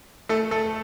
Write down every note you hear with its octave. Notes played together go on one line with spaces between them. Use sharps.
A3 A4
A3 A4